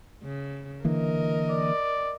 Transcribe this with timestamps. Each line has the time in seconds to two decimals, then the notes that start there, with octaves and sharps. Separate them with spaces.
0.22 C#3
0.85 D3 E3 A#3 A#4 D#5
1.51 D5